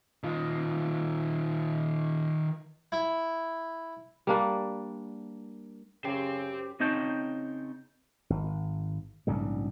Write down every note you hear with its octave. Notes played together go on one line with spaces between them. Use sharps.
D#3 F4
E4
G3 A#3 D4
F#2 C#3 G4 C5 G5
C#3 C4 D#4 C#5 G5 A5
G#1
A#1 G#2 C#3 G3